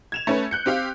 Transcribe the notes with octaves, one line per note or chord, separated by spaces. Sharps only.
G#6 E7 F7
A3 C#4 B4
F#6 G6 C#7
C4 G4 F5